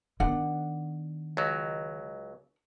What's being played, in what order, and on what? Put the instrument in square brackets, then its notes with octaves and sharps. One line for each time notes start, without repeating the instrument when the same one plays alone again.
[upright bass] D#3 B3 [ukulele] D4 F#5
[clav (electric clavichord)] C#2 F#3